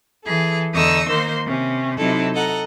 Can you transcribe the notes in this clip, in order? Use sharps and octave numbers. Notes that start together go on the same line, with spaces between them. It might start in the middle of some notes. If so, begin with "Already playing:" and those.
E3 G#4 A4
E2 D3 D#4 C#6 D#6 E6
D#3 A#3 D#4 C5 C6
C3 C#4
C3 F#3 D#4 E4 A4
A4 D#5 F#5 A#5